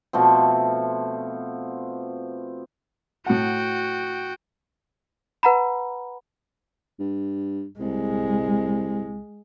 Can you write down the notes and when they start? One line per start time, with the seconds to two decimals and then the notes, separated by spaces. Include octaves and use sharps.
0.13 B2 F3 A3 C4
3.26 A2 F#4 F#5 G5
5.43 B4 F#5 A#5 B5
6.99 G2
7.80 C2 G#3